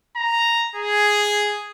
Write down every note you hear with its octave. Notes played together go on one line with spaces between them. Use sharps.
A#5
G#4